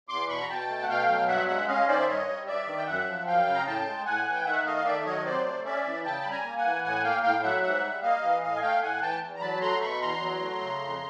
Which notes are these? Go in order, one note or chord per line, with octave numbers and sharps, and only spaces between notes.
E2 C6 D6
B2 B5 C#6
A#5
B2 G5 A5
A3
F#5
B2 F5 G5
F#3
G2 E5 F#5
G#3 E5 F#5
C#4 D#5 F5
D#3 C5 D5
E5
G2 C#5 D#5
G3
G2 D5 E5
D#3
G5
F#2 E5 F#5
F3
F#2 F5 G5
C#3
A#5
A2 G5 A5
G#3
A2 F#5 G#5
E3
G5
D#3 E5 F#5
A3 D#5 F5
F5
D#3 D5 E5
F#3 C#5 D#5
C3 C5 D5
A3
C#4 D5 E5
E3
C#3 G5 A5
G3 B5
G#5 A#5
A#3
F#5 G#5
E3
A2 F#5 G#5
A#3 F5 G5
A2 F5 G5
F#3 E5 F#5
G#2 E5 F#5
G3
A#3 D#5 F5
E3
A2 D#5 F5
G#5
A3 F5 G5
A2 F#5 G#5
E3 G5 A5
E2
A#5
F#3 A5 B5
A3 A#5 C6
B2 B5 C#6
E2 A#5 C6
F#3
A3
C#3
F2